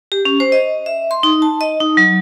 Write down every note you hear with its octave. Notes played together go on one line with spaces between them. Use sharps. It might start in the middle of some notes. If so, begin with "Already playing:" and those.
G4
C#4
C5
D#5
E5
C6
D#4
A5
D#5
D#4
F#3